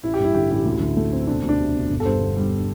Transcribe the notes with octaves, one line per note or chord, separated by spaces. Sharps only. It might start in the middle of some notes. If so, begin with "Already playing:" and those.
A1 E4
G4
G2 E4
D3 G4
A1 E4
D2
D3
A3
C4
E1 D4
D2
D4
C3
E1
G1
A4
G2 C5
D3
G3